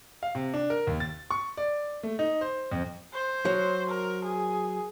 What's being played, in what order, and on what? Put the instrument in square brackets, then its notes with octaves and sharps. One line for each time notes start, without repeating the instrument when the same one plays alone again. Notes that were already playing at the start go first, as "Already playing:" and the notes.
[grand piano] F5
C3
D4
A#4
D#2
A6
C#6
D5
A3
D#4
C5
F2
[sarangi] C5
[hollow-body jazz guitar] F#3
[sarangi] A#4
G#4